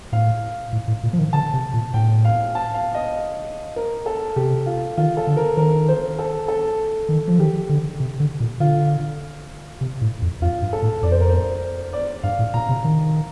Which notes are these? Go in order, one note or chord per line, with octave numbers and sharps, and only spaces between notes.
A2 F5
A2
A2
A#2
F3
D#3
D3 A5
C3
A#2
A2 G5
F5
A5
F5
D#5
A#4
A4
C3 G4
F4
D#3 F4
A4
D3
A#4
D#3 A#4
C5
A4
A4
D#3
F3
D#3 G4
D3
C3
D3
A#2
D3 F4
C3
A2
F2
F2 F4
G2
A4
A2
F2 D5
C5
A#4
C5
D5
G2 F5
A2
A#2 A#5
C3
D#3